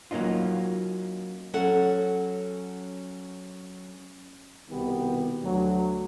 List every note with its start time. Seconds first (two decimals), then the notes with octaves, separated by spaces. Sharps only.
0.11 F#3 A#3 C#4 D#4 F4
1.53 F#3 C#4 A4 F#5
4.69 C2 B2 D#3 B3 G4
5.43 D2 F#3